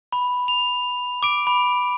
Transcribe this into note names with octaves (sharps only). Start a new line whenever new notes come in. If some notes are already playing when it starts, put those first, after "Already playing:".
B5
F7
D6 D7
B5